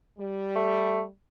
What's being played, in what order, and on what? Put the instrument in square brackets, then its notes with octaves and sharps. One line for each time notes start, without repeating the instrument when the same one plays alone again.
[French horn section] G3
[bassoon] A3